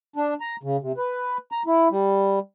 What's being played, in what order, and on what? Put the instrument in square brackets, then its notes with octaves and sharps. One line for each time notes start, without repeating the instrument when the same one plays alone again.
[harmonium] D4
A#5
C#3
C3
B4
A#5
E4
G3